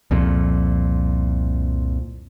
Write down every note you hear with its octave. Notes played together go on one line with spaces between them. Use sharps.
C2 F2 A#2